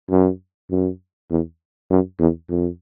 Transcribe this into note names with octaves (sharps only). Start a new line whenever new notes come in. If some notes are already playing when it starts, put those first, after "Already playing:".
F#2
F#2
E2
F#2
E2
F2